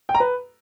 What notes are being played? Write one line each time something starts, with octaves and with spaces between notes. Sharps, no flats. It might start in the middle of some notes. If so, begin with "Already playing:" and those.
G5
A#5
B4